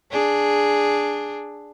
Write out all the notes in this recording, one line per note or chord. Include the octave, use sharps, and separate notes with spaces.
D4 G#4